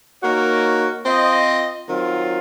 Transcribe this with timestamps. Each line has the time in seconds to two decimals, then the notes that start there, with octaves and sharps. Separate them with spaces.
0.21 A#3 D#4 F#4 A#4 C#5
1.06 C4 F4 C5 D#5
1.89 D#3 F#3 C4 F4